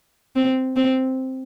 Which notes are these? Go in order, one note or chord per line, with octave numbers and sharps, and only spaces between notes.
C4
C4